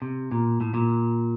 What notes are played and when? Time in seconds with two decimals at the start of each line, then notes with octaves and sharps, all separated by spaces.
0.02 C3
0.32 A#2
0.61 A2
0.74 A#2